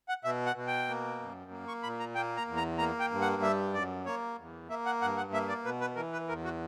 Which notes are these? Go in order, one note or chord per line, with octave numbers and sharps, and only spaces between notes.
F#5
B2 E5
F#5
B2
G5
A#3
F#2
A#3
C#6
A#2 B5
A#5
A#3 G5
A#5
E2
A#5
A#3 A#5
G5
G2
F#5
G3 E5
F#2 D5
A#3 C#5
E2
A#3 E5
F#5
G2 F#5
F#5
A#3 E5
D5
B2 B4
B4
E3 A#4
B4
E2 A#4
F#4